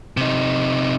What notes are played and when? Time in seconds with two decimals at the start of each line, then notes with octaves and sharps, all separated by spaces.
0.17 C3 D#4